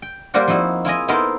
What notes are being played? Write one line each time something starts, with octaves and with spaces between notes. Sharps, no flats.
G5
G3 A#3 A#4 C5 D5 F#5
F3 C4 D#4 E4 F#4
E4 F4 G#4 D#5
B3 D#4 E4 A4 A#4 C5